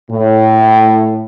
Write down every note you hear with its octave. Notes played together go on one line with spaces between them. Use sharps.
A2